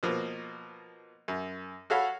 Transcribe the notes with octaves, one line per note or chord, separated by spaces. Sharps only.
B2 F3 A#3
F#2
F#4 A4 C#5 F5 F#5 B5